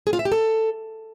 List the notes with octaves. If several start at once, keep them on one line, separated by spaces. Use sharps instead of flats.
G#4
F4
E5
G4
A4